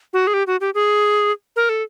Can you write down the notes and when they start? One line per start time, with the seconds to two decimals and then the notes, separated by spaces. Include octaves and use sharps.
0.13 F#4
0.27 G#4
0.34 G4
0.47 F#4
0.61 G4
0.75 G#4
1.56 A#4
1.69 A4